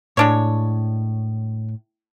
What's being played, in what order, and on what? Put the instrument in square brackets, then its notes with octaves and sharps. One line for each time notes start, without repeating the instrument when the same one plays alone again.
[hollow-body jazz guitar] A2 [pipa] G#3 D4 C#5